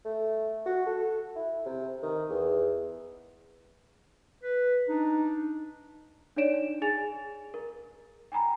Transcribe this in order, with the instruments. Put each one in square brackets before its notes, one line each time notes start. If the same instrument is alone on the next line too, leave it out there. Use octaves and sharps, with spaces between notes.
[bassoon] A3
F#4
A4
E4
C3
D#3
E2
[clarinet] B4
[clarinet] D4 [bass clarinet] D#4
[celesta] D4 D#4 C#5 D5 D7 E7
G#4 G#5 A6 F7
A#4
G5 G#5 A#5 B5